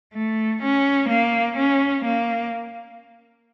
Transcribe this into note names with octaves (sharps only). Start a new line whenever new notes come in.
A3
C#4
A#3
C#4
A#3